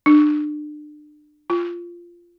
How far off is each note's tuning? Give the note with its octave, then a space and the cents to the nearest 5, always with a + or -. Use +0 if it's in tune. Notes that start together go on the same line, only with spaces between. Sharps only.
D4 +30
F4 -10